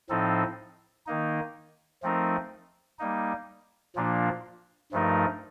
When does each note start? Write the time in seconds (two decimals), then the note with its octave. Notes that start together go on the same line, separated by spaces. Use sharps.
0.10 A2 F3 C4 D#4 A4
1.07 D#3 A#3 D#4
2.03 F3 A3 C4 D#4 A#4
2.99 G3 A#3 D#4
3.96 A#2 F3 A#3 D4 F4
4.92 G2 F3 A3 D#4 A#4